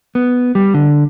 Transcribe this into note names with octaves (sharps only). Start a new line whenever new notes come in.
B3
G3
D3